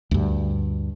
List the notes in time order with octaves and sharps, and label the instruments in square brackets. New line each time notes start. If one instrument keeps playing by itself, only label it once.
[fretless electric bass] D2 G2